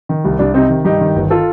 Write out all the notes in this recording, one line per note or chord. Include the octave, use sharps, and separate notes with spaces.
D#3
C2
C2 D4
C3 C4 D#4
D#3
G2 D#4 G4
D#3
G1
F4 A4